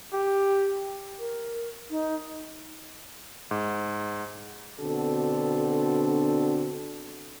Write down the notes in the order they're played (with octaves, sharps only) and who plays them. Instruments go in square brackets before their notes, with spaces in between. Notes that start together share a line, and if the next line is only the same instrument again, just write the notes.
[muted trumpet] G4
[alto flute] A#4
D#4
[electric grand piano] G#2
[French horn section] B2 D3 C4 D4 F#4 A4